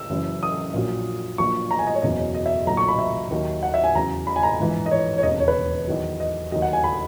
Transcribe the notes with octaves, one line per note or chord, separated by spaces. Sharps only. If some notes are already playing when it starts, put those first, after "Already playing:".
Already playing: E6
F#1 F#2 E3
D#6
A#1 A#2 F#3
A#1 A#2 F#3 C#6
A#5
G#5
D#5
C#5
F#1 E2 B2 F#3 D#5
D#5
E5
B1 A#2 F#3 A#5
C#6
B5
E5
D#2 D#3 F#3
F#5
E5
G#5
E2 C#3 F#3 A#5
B5
G#5
A#5
A#1 G#2 E3
D#5
C#5
C#5
E1 D#2 C#3 D#5
C#5
B4
E2 D#3 F#3
D#5
D#2 D#3 F#3 D#5
F#5
G#5
B5